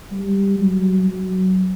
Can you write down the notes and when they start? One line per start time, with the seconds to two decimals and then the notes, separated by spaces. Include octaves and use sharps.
0.12 G3
0.60 F#3
1.07 F#3